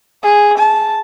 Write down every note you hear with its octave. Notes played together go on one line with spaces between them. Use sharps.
G#4
A5